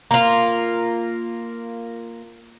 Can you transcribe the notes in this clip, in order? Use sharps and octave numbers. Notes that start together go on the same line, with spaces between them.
A#3 F4